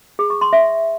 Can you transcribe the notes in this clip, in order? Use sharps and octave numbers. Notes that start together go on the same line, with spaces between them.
G#4
C#6
C6
E5